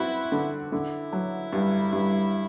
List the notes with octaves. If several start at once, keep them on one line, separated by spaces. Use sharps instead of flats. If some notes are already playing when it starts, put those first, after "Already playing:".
Already playing: C4 E4 F#4
D3
D3 E4
F#3
G2
G2